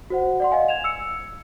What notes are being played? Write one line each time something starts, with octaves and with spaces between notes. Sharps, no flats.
F#4 C5 F#5
D5 F#5 C6
D#5 F5 G#5
G#6 E7 F7
E6 C#7